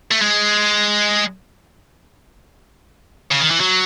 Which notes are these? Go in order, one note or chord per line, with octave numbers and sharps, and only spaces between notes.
A3
G#3
C#3
D#3
E3
F#3